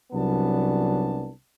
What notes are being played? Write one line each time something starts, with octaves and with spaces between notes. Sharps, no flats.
C2 F#3 B3 C#4 D4 A5